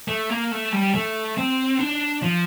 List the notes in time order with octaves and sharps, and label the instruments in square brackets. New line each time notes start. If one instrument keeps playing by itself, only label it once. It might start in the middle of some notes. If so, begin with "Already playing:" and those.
[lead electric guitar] A3
A#3
A3
G3
A3
C4
D4
F3